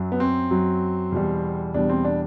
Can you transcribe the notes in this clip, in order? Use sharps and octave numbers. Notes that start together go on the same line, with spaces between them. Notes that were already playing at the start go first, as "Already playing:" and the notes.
Already playing: F#2 F#3
B3
C4
F#2 F#3
E2 B2 G3
E2 B2 G3 D4
C4
D4